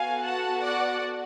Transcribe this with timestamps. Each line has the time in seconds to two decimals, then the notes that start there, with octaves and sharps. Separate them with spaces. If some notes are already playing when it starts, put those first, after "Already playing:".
Already playing: B3 F#4 A4 F5 G#5
0.23 F#5 A5
0.62 D5 F#5